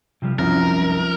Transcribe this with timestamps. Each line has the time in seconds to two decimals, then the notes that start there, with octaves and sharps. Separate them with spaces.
0.22 C3 F3 G3
0.39 C2 F#2 F3 G3 C#4 D#4 A#4